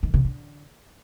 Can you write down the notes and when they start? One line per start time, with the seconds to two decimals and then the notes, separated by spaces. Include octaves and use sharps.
0.03 D#3
0.14 C#3
0.25 D3